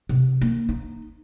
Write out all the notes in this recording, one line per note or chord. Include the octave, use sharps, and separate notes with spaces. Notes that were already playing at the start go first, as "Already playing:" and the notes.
C3
A#3
D#4